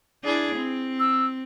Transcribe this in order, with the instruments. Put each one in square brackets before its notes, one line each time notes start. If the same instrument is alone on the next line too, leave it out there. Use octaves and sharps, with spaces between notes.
[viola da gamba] D4 E4 G#4
C4
[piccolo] E6